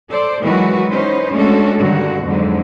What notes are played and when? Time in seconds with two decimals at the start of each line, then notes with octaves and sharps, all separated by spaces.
0.10 A4 C5 D5
0.43 D#3 E3 F#3 G#3 F#4 B4
0.91 C#4 D#4 B4 C5
1.32 G#3 A3 C#4 D4 F#4 A4
1.79 G2 D3 D#3 F#4
2.24 F2 G#2 D3 F#3